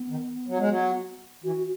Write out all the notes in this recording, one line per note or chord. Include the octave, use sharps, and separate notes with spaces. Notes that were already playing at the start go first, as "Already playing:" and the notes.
Already playing: B3
D#3
F#3
G#3
F#3
E3 F#4